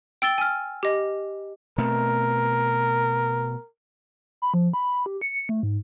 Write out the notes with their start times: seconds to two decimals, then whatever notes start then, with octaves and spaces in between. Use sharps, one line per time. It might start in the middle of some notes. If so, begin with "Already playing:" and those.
0.22 G5 E6 A6 G7
0.38 G#5 F6
0.83 G4 D#5
1.78 B2 A3 C4 A#4
4.42 B5
4.54 F3
4.74 B5
5.06 G4
5.21 C#7
5.49 A3
5.63 G#2